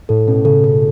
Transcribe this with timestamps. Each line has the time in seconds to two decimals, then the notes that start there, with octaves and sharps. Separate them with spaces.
0.09 A2 A4
0.27 B2 C#4
0.45 C#3 A4
0.64 B2 A4